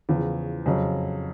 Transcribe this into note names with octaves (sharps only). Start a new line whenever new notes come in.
E2 C#3 F3
F2 C#3 F#3